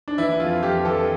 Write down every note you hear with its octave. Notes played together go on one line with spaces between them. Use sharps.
D4
E3 E4
F2 F4
F2 G4
E3 A4